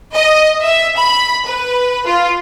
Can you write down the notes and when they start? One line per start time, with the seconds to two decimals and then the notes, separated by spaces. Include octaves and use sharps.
0.14 D#5
0.63 E5
0.98 B5
1.45 B4
2.06 F4